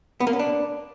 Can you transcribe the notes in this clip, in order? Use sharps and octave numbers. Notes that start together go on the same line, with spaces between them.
B3
A#3
C#4
D4